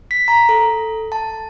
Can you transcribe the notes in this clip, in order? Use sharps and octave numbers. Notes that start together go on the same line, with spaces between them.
B6
A#5
A4
A5